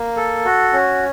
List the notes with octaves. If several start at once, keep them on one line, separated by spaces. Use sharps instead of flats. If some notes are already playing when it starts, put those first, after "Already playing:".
Already playing: A#3
A4
F#4
C#4